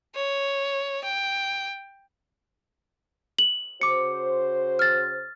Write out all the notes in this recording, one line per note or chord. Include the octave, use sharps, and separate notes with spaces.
C#5
G5
F#7
C#3 F#4 C5 D6 C#7
F6 A6